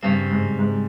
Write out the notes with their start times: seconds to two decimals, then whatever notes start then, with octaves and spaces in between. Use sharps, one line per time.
0.03 G2 C#3 G3 C4
0.31 G#2
0.59 G#2